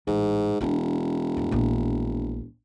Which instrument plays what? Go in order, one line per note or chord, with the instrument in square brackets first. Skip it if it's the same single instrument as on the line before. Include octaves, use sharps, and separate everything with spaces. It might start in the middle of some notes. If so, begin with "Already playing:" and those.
[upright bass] A1 [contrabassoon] G#2
[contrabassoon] E1 [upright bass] C#4 D4
[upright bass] F2 A2
A#1